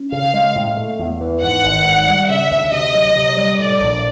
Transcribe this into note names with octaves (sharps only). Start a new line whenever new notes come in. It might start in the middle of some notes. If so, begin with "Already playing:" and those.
Already playing: C#4
C#3 F5
G#3
A2
A3
E2
E3
G#2 F#5
G#1
G#2
G3
C#3 E5
D2
C3 D#5
F#3
C3
G3
A2 D5
A#1